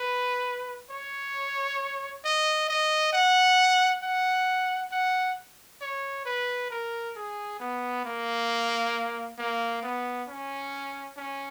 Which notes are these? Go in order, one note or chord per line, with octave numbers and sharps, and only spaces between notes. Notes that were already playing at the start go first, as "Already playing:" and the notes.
Already playing: B4
C#5
D#5
D#5
F#5
F#5
F#5
C#5
B4
A#4
G#4
B3
A#3
A#3
B3
C#4
C#4